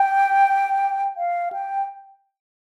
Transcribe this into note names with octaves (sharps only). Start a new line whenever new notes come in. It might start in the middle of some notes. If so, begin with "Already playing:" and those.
Already playing: G5
F5
G5